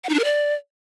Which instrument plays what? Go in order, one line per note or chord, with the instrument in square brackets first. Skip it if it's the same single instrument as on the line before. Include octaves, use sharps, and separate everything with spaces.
[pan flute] F#5
D#4
D4
A#4
D5